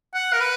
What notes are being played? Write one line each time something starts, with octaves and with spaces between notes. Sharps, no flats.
F#5
A#4
B4